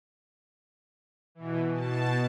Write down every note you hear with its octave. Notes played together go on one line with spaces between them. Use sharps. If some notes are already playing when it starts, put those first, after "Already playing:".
B2 E3
B2 A5